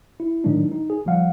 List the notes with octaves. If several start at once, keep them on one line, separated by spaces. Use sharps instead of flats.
E4
A2 D#3 F#3 G#3 D4 D#4
D#4
G#4
G1 F3 G3 F5 F#5